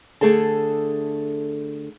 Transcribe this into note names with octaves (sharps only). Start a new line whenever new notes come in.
D3 A3 G#4 A4 A5